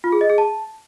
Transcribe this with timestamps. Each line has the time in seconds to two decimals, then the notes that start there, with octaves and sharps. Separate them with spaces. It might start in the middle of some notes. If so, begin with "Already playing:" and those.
0.04 F4
0.12 G#4
0.21 D#5
0.29 G#4
0.38 A5